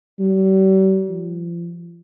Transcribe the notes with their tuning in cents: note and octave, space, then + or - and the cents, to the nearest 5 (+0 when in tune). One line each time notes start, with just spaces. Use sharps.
G3 -45
F3 -35